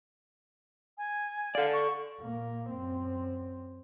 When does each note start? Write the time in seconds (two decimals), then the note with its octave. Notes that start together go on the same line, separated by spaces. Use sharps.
0.98 G#5
1.55 A4 D5 F5
1.73 C#6
2.20 A#2 A#3
2.70 F#2 C4